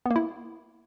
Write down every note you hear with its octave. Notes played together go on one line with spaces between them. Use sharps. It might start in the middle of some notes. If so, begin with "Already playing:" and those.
B3
A#3
E4